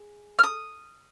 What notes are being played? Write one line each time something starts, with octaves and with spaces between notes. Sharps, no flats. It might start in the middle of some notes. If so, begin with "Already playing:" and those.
Already playing: G#4
F6
D#6